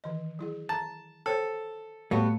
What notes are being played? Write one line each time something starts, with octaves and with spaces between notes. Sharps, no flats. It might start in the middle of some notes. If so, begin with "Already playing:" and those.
D#3 E3 D#5
F#3 E4 G#4
A5 A#5
A4 C5 C#5 G5
A2 G3 A3 B3 F#4 C#5 F5 A5